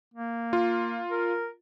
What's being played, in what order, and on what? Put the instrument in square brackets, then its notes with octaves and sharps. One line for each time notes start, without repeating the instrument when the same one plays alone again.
[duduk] A#3
[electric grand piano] F4
[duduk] A#4